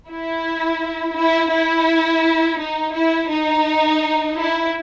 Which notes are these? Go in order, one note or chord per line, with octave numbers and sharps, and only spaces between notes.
E4
E4
E4
D#4
E4
D#4
E4